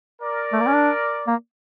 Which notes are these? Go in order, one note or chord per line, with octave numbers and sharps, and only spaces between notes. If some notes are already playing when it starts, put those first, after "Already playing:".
A#4 D5
A3
A#3
C#4
D4
A#3